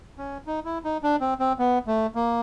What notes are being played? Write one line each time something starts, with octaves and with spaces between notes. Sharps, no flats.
C#4
D#4
E4
D#4
D4
C4
C4
B3
A3
A#3